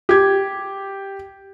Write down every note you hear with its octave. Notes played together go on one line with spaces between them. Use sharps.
G4 G#6